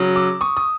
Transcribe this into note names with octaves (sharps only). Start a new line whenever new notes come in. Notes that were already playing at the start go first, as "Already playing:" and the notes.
Already playing: C#3 F#3
D6 E6
C#6 D#6
D#6